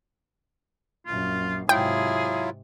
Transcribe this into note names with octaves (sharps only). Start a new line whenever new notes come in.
A#1 F#2 F4
G#2 C3 F#3 E4 F4 G#4 G5